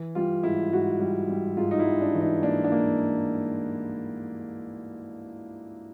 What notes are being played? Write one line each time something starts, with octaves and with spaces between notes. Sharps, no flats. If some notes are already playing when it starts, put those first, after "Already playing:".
Already playing: E3
G3 F4
G#2 E4
G#2 F#4
G3
G3
G#2 F4
D#4
E4
G3
D4
E3
D#4
A#3 D4
D4
A#3